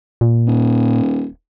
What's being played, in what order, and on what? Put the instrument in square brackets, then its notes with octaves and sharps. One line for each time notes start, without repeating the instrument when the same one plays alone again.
[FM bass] A#2
[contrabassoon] D#1